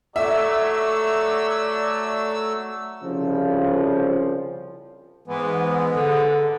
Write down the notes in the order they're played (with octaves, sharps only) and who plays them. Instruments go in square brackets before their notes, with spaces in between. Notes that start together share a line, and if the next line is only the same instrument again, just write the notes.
[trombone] F#3 [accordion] A3 E6 [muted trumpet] D5 [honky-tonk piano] E5
[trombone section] C2 C#3 F3
[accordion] G#2 G#3 B3 [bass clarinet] E3
[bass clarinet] D3